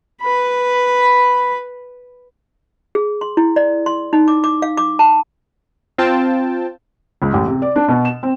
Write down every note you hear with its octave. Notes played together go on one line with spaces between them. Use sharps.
B4 B5
G#4
C6
E4
D5
C6
D#4
D6
D6
F5
D6
A5
C4 F4 G5 A5
C#2
A1
C3
D5
D4
B2
E7
C4